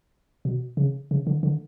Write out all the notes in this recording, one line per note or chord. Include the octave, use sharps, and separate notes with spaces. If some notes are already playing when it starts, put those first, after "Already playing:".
B2
C#3
C#3
D3
D3